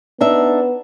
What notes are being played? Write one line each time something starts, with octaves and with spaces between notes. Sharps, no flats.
B3 D4 D#4 E5